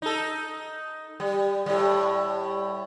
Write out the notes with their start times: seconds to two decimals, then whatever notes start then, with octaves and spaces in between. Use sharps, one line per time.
0.02 D#4 A4
1.20 G3
1.66 A2 G3